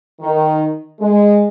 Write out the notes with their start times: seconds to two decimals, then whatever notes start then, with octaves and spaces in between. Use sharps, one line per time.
0.20 D#3
0.98 G#3